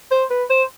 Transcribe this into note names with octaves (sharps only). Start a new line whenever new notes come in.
C5
B4
C5